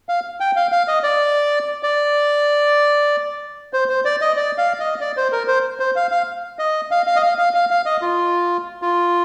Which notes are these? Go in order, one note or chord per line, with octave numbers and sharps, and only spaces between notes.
F5
G5
F5
F5
D#5
D5
D5
C5
C5
D5
D#5
D5
F5
D#5
D5
C5
A#4
C5
C5
F5
F5
D#5
F5
F5
D#5
F5
F5
F5
F5
D#5
F4
F4